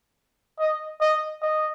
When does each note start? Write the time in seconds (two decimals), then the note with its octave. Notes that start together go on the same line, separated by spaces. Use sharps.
0.59 D#5
1.01 D#5
1.42 D#5